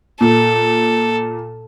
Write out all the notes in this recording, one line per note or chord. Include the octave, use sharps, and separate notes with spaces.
A#2 A4